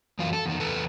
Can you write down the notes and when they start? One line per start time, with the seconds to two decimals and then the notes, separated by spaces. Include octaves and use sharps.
0.19 F#2 E3 F4
0.33 A4
0.46 E2 D#3
0.60 E2 A4 B4